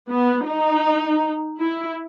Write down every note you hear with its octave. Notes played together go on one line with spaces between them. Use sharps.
B3
D#4
E4